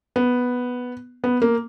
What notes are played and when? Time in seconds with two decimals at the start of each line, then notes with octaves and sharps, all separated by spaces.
0.16 B3
1.24 B3
1.42 A#3